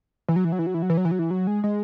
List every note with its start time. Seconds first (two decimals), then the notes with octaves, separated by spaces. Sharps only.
0.29 E3
0.36 F#3
0.45 E3
0.52 F#3
0.59 E3
0.67 F#3
0.74 E3
0.82 F#3
0.90 E3
0.97 F#3
1.05 E3
1.11 F#3
1.19 E3
1.31 F#3
1.47 G#3
1.64 G#3